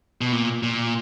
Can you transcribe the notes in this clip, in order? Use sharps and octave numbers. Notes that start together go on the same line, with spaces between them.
B2
A#2
A#2